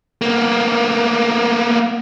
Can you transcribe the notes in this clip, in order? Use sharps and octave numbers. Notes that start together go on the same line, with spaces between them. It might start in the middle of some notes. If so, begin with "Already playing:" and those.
A#3 B3